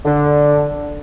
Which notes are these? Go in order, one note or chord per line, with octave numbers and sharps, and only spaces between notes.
D3